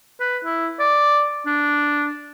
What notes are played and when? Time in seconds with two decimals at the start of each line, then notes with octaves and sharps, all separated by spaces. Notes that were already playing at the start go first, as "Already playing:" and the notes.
0.20 B4
0.45 E4
0.80 D5
1.46 D4